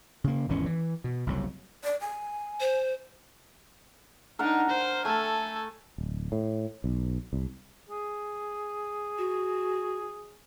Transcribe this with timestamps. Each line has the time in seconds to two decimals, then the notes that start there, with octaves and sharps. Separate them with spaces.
0.24 C#3 A#3
0.49 G#1 E2 E3 C#4
0.66 E3
1.04 B2
1.27 F#1 C2 F#3
1.84 D5
2.01 G#5
2.60 C5
4.39 D4 D#4 A#4 F#5 A#5
4.69 C5
5.05 A3 A4 G#5
5.98 D1
6.32 A2
6.84 B1
7.33 C2
7.89 G#4
9.18 F#4